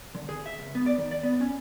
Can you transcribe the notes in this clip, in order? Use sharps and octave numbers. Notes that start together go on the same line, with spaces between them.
D3
G#4
E5
C#2
B3
D5
D#3
D5
B3
C#4